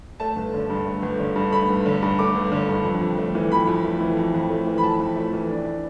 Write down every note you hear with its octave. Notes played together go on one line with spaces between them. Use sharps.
A3 A5
G1
D3
G2
A3
G1
D3
G2
A3 B5
G1
D3
G2
A3 D6
G1
D3
G2
F2
F2
A3
E3
F2 B5
F2
A3
E3
F2
F2
A3
E3
B5
F2 A5
F2
A3
E3
D4